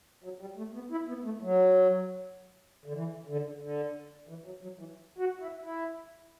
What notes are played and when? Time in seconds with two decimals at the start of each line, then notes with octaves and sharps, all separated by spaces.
0.24 F#3
0.41 G3
0.58 A3
0.74 B3
0.91 E4
1.08 B3
1.25 A3
1.42 F#3
2.86 D3
2.94 E3
3.27 D3
3.61 D3
4.29 E3
4.45 F#3
4.63 F#3
4.79 E3
5.18 F#4
5.41 E4
5.63 E4